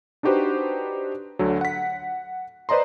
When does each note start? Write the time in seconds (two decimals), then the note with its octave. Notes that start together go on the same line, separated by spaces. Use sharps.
0.23 D4 D#4 F#4 G4 B4 C5
1.39 D2 D3 F#3
1.61 F#5 B6
2.69 B4 C5 D5 D#5 A#5 C6